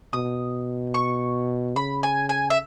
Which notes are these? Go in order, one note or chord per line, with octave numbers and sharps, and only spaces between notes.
B2 D#6
C#6
C#3 B5
G#5
G#5
E5